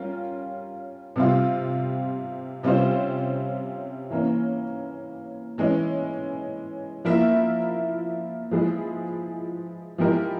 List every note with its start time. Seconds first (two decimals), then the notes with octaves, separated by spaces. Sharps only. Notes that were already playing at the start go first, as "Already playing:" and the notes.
Already playing: G3 C#4 F4 A#4
1.16 C3 G3 C4 F4
2.63 C3 G3 C#4 F4 C5
4.10 E3 A#3 C#4
5.58 E3 G#3 C#4
7.05 F3 A#3 E4 A#4 E5
8.51 F3 G#3 E4 G#4
9.98 F3 G#3 E4 G4 A#4